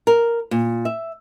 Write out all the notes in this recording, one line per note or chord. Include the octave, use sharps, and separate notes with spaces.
A#4
A#2
E5